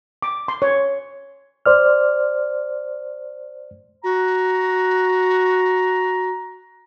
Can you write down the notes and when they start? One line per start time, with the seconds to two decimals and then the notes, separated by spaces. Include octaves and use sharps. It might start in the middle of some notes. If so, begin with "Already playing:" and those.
0.22 D6
0.48 C6
0.62 C#5
1.66 C5 D5 F6
4.04 F#4 A#5